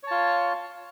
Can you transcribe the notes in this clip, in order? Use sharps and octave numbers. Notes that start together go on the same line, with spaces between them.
F4 C#5 A5